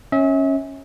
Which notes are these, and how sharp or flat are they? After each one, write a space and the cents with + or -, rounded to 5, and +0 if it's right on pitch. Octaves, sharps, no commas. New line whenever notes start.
C#4 -15 E5 -40